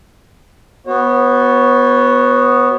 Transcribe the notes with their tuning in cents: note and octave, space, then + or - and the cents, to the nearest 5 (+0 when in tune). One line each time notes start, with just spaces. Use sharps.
B3 +0 F#4 +0 C#5 -40